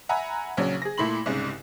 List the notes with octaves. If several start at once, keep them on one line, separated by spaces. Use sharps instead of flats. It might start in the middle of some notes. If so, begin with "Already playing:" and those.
E5 F#5 G#5 A#5 B5
A#1 C#3 F#3
G#4 A#6
A#2 A3 E4 B5 C6 F#7
C2 G#2 C#3